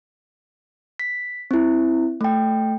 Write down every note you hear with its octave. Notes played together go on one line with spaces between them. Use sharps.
B6
C4 E4
A3 G5